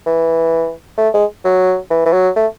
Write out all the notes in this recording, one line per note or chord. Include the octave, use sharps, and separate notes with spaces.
E3
A3
G#3
F#3
E3
E3
F#3
A3